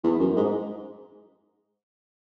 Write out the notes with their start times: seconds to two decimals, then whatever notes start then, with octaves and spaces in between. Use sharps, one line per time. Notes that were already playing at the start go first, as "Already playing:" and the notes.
0.04 E2
0.20 F#2
0.36 G#2